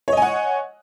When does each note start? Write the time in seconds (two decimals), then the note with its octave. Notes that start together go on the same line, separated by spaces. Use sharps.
0.08 C#5
0.12 D#5
0.17 G#5
0.22 F#5